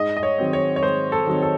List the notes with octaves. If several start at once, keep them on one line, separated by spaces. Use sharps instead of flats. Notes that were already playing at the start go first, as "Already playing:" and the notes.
Already playing: G#2 D#5
D#5
C#5
D#3 F#3 C4
C#5
C#5
G#2 C5
A4
D#3 F#3 C4
A4